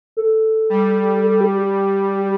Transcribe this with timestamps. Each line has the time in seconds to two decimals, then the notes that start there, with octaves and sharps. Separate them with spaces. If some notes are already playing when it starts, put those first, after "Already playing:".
0.17 A4
0.70 G3
1.23 A4
1.41 G4
1.58 G4